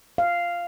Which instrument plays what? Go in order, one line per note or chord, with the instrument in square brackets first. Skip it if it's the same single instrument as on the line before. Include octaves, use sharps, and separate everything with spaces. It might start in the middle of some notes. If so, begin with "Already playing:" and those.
[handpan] F5